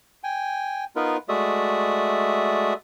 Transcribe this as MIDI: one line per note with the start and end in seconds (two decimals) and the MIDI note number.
0.24 0.84 79
0.24 0.84 80
0.96 1.17 59
0.96 1.17 63
0.96 1.17 65
0.96 1.17 70
0.96 1.17 71
1.29 2.74 56
1.29 2.74 57
1.29 2.74 66
1.29 2.74 74
1.29 2.74 76
1.29 2.74 87